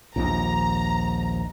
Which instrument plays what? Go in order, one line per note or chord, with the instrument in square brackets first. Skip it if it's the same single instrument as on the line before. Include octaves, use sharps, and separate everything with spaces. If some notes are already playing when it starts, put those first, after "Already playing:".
[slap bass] A#1 D#2 G#2 [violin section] A#5